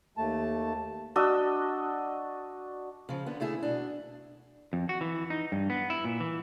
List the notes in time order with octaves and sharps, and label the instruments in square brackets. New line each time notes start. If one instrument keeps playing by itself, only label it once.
[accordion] D#2 A3 A5
[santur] D4 F#4 D#5 E6
[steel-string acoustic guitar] C#3 F3
D3 B3
C#3 A3 E4 G#4
B2 D4
[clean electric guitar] F2
F#4
E3
D#4
G2
B3
E4
A#2
E3